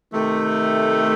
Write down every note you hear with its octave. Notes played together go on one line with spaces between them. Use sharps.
C3 D#3 A3